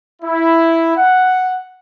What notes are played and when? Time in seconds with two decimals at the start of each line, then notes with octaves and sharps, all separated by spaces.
0.22 E4
0.96 F#5